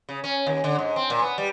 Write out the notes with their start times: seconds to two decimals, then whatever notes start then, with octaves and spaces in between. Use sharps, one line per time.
0.09 C#3
0.24 C#4
0.47 D#2
0.64 D3
0.78 G#2
0.96 C4
1.10 A#2
1.22 B3
1.38 G3